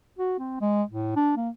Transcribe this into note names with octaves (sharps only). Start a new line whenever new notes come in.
F#4
C4
G#3
A2
D4
A#3